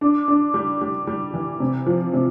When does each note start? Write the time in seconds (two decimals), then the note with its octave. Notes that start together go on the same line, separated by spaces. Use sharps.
0.01 D4
0.28 D4
0.54 G3
0.81 G3
1.07 G3
1.33 E3
1.60 C3
1.86 F3
2.13 C3